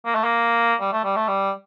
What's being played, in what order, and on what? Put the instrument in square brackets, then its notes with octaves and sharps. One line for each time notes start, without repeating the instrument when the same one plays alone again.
[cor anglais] A#3
A3
A#3
G3
A3
G3
A3
G3